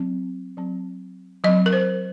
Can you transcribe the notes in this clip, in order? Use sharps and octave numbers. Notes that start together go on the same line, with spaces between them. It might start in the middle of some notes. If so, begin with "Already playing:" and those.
Already playing: F#3 C4
F#3 C4
F#3 C4 D#5
A#4
C5